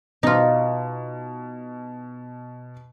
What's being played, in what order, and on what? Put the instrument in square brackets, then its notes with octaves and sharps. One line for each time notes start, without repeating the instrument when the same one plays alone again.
[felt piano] B2 [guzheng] D#4 F4